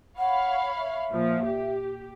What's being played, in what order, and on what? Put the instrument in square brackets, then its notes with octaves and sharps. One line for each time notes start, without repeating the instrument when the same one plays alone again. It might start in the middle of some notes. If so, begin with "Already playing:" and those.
[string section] C#5 F5 B5 [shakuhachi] F#5
[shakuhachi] E5
[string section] A#2 F3
G4